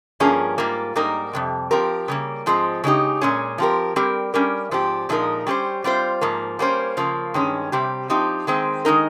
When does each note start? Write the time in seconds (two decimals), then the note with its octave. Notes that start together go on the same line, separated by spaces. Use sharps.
0.20 G2 F3 A#3 C#4 G#4
0.58 G#2 G3 A#3 F4
0.96 G#2 G3 A#3 D#4 A#4
1.33 F2 C3 G3
1.71 F3 C4 G4 A#4
2.08 C#3 G3 A#3
2.46 G#2 F3 G#3 C4
2.84 C#3 G#3 D#4 G4
3.21 A#2 G#3 C#4 G#4
3.58 F3 C4 G4 A#4
3.96 G3 C4 G4 A#4
4.34 G3 C#4 G4 A#4
4.71 G#2 F3 C4 G4
5.09 A#2 F3 G#3 D#4 A#4
5.47 G3 C#4 G4 C5
5.84 G3 C4 F4 C5
6.21 G#2 F3 A#3
6.59 G3 A#3 C#4 G#4 C5
6.97 C#3 F3 A#3
7.34 G2 D#3 G#3 C#4
7.72 C3 G3 C4 G4
8.10 F3 C4 D#4 G4
8.47 D#3 G#3 C4
8.85 D#3 G#3 D#4 A#4